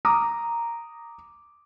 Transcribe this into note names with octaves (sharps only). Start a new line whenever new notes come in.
A#5 D6 D#6